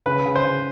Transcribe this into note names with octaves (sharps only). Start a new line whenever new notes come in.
C#3 B4
C#3
C5
C#3